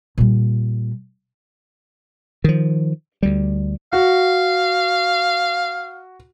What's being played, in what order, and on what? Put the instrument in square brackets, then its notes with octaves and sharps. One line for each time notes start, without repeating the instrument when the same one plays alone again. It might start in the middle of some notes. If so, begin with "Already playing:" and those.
[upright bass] A#2 G3
[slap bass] D#3 F3
D2 G3
[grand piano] F#4 [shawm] F5